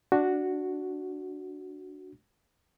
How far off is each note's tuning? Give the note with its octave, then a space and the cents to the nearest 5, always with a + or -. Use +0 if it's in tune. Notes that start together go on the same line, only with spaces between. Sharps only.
D4 +0 F#4 +0